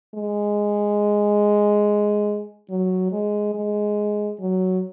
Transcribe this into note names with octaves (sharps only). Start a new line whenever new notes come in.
G#3
F#3
G#3
G#3
F#3